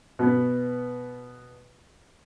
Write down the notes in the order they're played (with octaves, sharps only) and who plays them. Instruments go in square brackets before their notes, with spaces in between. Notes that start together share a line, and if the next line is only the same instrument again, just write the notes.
[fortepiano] B2 B3